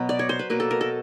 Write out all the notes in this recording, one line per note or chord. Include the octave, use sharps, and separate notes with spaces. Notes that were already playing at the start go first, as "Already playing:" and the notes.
Already playing: B2 F#3 B3
D5
C#5
C5
B4
B2 F#3 A#3 B4
A4
A#4
A4